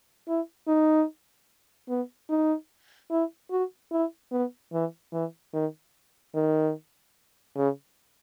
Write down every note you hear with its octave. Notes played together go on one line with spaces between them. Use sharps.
E4
D#4
B3
D#4
E4
F#4
E4
B3
E3
E3
D#3
D#3
C#3